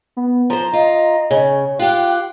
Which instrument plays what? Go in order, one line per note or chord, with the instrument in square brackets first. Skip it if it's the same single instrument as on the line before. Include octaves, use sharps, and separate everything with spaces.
[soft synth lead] B3
[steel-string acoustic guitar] F3 C5 [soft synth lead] A#5
[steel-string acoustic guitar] F4 [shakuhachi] D#5
[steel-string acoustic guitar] C#3 [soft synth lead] C#5
[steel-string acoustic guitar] F4 G4 [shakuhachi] G5 [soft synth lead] F#6